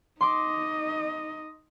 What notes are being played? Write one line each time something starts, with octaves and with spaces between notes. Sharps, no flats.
D#4 D#5 C6 D6